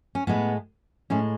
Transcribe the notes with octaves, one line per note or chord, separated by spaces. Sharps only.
C#4
A2 G#3 B3
A2 G#3 C#4